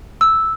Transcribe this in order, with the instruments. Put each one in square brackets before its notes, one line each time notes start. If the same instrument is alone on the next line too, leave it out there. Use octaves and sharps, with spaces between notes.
[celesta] E6